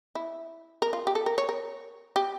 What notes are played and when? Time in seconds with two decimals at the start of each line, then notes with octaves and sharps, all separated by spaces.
0.15 E4
0.82 A#4
0.93 F4
1.07 G4
1.15 A4
1.26 A#4
1.38 C#5
1.49 A#4
2.16 G4